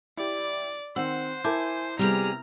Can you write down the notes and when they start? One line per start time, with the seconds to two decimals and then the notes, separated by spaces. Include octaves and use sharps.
0.17 E4 G4 D5
0.96 D#3 C4 C5 F#5 E6
1.44 E4 A#4 G#5 A5 D6 G6
1.99 C3 G3 B3 G4 G#4 A#5 F6